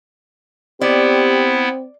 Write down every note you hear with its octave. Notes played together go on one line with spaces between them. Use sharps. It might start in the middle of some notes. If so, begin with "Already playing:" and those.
B3 C4 E4 G4 D5